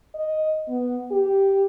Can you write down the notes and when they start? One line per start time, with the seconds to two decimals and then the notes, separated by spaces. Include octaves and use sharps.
0.14 D#5
0.68 B3
1.11 G4